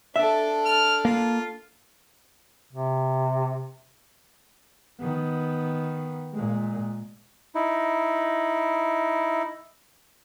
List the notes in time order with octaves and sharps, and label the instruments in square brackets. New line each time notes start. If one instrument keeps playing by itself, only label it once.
[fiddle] D4 A4 [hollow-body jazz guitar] E5
[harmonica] F6
[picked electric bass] A#3 [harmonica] F4
[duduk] C3
[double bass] D#3 B3
A#2 G#3
[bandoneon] D#4 E4